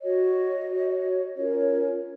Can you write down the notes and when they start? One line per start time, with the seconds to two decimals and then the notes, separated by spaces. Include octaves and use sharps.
0.02 F#4 C#5 D#5
0.68 F#4 C#5
1.35 C#4 F4 A#4 C#5
1.57 C#5